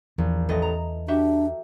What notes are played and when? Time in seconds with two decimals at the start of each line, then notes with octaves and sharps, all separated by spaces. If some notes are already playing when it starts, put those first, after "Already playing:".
0.18 A#1 E2
0.49 A1 D#5 A#6
0.62 A#5
1.08 D4 F#4 G4 E5